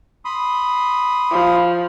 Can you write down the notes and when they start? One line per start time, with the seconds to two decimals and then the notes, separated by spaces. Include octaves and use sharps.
0.25 B5 C6 D#6
1.31 F3